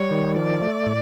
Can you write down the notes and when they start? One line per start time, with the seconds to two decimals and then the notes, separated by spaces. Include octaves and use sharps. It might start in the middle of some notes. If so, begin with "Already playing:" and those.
Already playing: G3 C#5
0.11 D#3
0.36 F3 D5
0.62 A3
0.86 A2